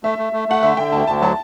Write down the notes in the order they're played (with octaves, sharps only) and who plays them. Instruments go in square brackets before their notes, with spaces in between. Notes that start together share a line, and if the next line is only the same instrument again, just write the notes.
[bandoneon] A3 [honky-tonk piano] E5
[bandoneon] A3
A3
[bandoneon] A3 [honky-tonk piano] F#5
[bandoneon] D3 [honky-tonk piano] E5
[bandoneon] D3 [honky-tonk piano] G5
[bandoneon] D2 [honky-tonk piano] A5
[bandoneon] D2 [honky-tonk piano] A5
[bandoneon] F#3 [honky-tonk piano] A5